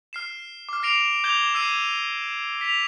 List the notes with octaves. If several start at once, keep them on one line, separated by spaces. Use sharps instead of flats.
F6 C7 E7
D6 F6
F6 A#6 C7 D7 F7
D6 G6 G#6 F7 G7
E6 G#6 C7 D#7 E7
B6 F7